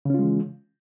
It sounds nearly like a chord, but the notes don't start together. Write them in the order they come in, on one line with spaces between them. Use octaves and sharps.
C#3 C#4 F4 G#3 E3